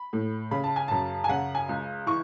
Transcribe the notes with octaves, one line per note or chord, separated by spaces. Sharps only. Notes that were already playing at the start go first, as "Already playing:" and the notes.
Already playing: B5
A2
C#3 B5
A5
G#5
F#2 A5
G#5
C#3 F#5
G#5
C#2
E3 C#6